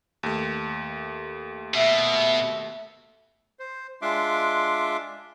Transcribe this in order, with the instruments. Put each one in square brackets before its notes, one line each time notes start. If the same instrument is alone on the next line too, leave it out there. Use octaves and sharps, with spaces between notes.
[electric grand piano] D#2 A3
[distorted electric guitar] B2 [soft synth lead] E5
[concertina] C5
G#3 D4 F4 E5 C6 D6